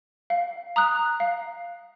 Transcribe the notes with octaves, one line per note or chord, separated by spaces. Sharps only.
F5
A#5 D#6 F#6
F5